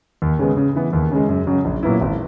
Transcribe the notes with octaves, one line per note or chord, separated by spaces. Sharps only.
D#2
C#3 G#3 B3
C#3
E3 B3
D#2
C#3 G#3
F#2
C#3 F#3
A#1
A#2 F#3 B3 E4
G#1